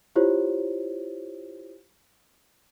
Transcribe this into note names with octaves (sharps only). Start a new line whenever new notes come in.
E4 F4 G4 C5 C#5